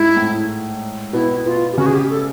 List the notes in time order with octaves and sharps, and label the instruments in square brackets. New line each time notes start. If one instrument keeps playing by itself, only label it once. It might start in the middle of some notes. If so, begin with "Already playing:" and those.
Already playing: [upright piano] G#2 G#3 [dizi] E4
[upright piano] A2 A3
[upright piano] B2 B3 [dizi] E4
[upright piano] B2 B3 [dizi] F4
[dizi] G4
[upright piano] C#3 C#4 [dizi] F#4
[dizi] G#4
G4
A4